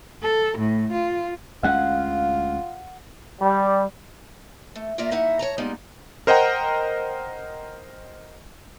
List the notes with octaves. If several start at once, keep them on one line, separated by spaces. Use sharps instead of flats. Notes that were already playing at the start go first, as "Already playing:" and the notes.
A4
A2
F4
D2 G#3 C#4 F4 F5 F#5
G3
A3
A#3 F4 A#4 D5 E5
A#3 D#4 E4 E5 F#5
C#5 A5 A#5
G3 G#3 A#3 B3 D#4 F4
A#4 C5 D#5 F#5 G5 A#5